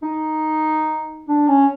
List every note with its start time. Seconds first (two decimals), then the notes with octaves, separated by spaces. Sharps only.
0.03 D#4
1.28 D4
1.48 C#4